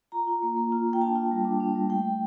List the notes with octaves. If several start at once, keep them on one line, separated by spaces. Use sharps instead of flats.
F4 A#5
F4
A#3
A#3
F4
A#3
G5
D4 A5
F4
G3
D4
D4
G3
A3 G5
A3